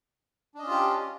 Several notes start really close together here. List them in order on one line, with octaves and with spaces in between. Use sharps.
D4 D#5 C#4 F4 G4